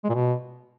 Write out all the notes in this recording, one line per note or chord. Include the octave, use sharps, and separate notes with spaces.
G#3
A#2
B2